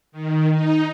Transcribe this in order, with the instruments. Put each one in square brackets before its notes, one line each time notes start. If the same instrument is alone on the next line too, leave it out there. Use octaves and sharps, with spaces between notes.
[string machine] D#3
D#4